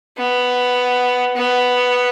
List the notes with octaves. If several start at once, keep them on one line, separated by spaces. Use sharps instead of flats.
B3
B3